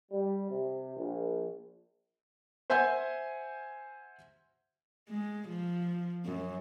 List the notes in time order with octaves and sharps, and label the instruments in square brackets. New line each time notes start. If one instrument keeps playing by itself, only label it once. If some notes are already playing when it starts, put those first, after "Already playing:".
[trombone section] G3
C3
A#1
[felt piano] C5 E5 F#5 G#5 C6 G6
[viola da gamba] G#3
F3
F#2